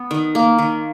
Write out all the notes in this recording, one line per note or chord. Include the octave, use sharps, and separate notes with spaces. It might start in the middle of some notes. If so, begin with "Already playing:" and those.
Already playing: B3
D#3
A#3
D#3